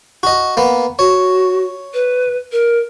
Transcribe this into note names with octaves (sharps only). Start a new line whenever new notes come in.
F#4 D#5
A#3 B3
F#4 C#5
B4
A#4